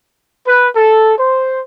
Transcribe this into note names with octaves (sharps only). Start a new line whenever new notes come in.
B4
A4
C5